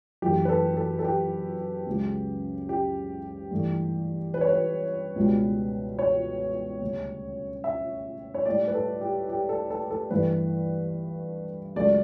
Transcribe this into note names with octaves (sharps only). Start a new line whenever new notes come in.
F#2 E3 A3 G4
B4
A4
A4
A4
G4
C#2 C#3 F#3
G4
G2 E3 A3
B4
C#5
B4
C#2 B2 G3
C#5
D2 C#3 G3
E5
C#5
A2 G3 D5
B4
A4
G4
G4
A4
A4
A4
G2 E3 A3 B4
C#2 C#3 F#3 A3 D5